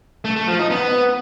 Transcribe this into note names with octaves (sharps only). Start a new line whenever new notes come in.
A3
A3
F3
D#4
B3